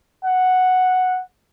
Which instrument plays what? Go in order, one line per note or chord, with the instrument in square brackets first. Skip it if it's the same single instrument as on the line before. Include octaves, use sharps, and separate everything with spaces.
[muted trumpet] F#5